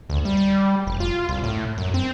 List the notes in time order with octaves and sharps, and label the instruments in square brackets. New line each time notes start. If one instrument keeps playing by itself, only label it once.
[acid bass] D2
G3
G3
F1
F4
C2
A2
F#2
C4